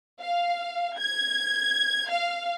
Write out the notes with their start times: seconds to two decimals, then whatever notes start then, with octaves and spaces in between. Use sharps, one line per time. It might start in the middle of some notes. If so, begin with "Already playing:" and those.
0.20 F5
0.98 G#6
2.10 F5